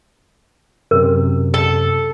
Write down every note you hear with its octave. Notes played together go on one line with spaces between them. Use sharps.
F#2 C3 A#4
A4